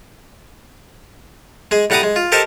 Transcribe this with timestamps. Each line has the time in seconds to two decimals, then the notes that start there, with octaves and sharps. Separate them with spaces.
1.71 G#3 G#4
1.90 A2 G3 F#5 A#5 D6 D#6
2.03 G#3
2.16 F4
2.32 G4 A4 A#4 C5 D#5 A5